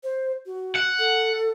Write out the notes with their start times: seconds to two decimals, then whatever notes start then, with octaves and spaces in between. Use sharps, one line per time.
0.03 C5
0.46 F#4
0.76 F#5
0.98 A4